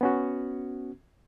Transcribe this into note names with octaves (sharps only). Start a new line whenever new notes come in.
B3 C#4 F#4